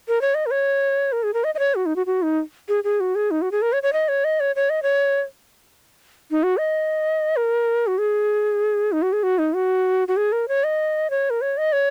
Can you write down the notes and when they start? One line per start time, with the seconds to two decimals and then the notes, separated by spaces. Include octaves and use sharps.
0.08 A#4
0.21 C#5
0.35 D#5
0.46 A#4
0.51 C#5
1.12 A#4
1.23 G#4
1.34 A#4
1.44 D#5
1.55 D#5
1.59 C#5
1.75 F#4
1.86 D#4
1.96 F#4
2.06 F#4
2.22 D#4
2.69 G#4
2.84 G#4
3.00 F#4
3.15 G#4
3.31 D#4
3.42 F#4
3.52 G#4
3.62 A#4
3.73 C#5
3.83 C#5
3.93 D#5
4.08 C#5
4.24 D#5
4.40 C#5
4.56 C#5
4.70 D#5
4.83 C#5
6.31 D#4
6.43 F#4
6.59 D#5
7.36 A#4
7.87 F#4
7.98 G#4
8.92 D#4
9.02 F#4
9.13 G#4
9.23 F#4
9.38 D#4
9.55 F#4
10.08 F#4
10.17 G#4
10.32 A#4
10.48 C#5
10.64 D#5
11.10 C#5
11.30 A#4
11.41 C#5
11.58 D#5
11.73 C#5